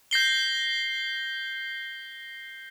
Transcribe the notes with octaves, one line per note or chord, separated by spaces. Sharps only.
G6 A#6 C7 G7